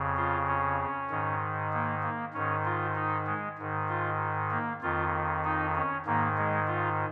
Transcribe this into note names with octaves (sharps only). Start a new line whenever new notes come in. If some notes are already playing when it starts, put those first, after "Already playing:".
Already playing: F2 C#3
F4
C#4
G#2 D#3
A#3
A#3
G#2 D#3 C#4
F4
D#4
G#3
G#2 D#3
F4
A#3
F2 D#3 F4
D#4
C#4
G#2 D#3 A#3
G#3
F4